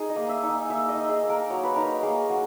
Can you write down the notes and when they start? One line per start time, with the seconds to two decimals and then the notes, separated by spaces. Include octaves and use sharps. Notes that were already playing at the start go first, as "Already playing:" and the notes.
Already playing: D#4 G#4
0.09 D#5
0.16 A#3
0.29 E5
0.43 D#4
0.49 G#5
0.69 A#3 E5
0.89 D#5
0.96 D#4
1.09 G#4
1.23 A#3
1.30 A#4
1.50 F#3 C#5
1.64 B4
1.76 D#4 A#4
2.03 A#3 G#4
2.29 F#3 F#4